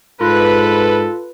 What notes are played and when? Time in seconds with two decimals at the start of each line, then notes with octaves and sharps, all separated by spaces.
0.21 G#2 F4 A4 B4